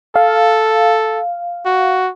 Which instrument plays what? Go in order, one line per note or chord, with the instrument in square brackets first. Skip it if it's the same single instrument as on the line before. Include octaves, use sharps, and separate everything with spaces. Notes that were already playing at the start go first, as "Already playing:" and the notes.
[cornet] A4 [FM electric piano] F5
[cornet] F#4